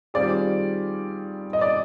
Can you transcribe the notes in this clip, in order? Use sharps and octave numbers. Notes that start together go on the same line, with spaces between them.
D#3 G3 C4 F4 G#4 D5
D#5
D5